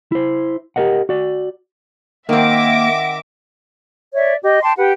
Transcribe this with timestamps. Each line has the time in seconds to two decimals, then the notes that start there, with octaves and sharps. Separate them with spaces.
0.12 E4 C5
0.76 G4 A4 A#4 D#5 F#5
1.09 F#4 D5
2.29 D#3 A#3 C4 E5 F#5 D6 A#6
4.15 C#5 D5 E5
4.42 G4 D#5
4.61 G5 A5 C6 D6
4.77 G4 B4 F#5 G5